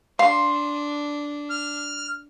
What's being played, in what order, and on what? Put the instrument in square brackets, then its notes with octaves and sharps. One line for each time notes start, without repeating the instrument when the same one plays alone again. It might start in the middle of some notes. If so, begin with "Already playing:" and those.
[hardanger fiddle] D4 [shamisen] F5 [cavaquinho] C6
[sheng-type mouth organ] F6